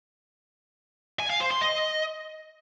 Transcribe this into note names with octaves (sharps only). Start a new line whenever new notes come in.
G#5
F5
C5
C6
D#5